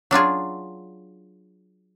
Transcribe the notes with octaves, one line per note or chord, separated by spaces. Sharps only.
F#3 D4 F4 G#4